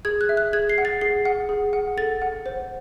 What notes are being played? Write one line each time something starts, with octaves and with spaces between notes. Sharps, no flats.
G#4 G#6
F#6
E5
F#6
G#4 G#6
C7
F#5
A6
G#4 C7
F#5
G#4
F#5
A4 A6
F#5
C5